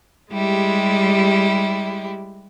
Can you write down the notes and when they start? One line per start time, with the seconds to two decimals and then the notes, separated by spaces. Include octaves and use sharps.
0.33 G3 G#3 E4 G4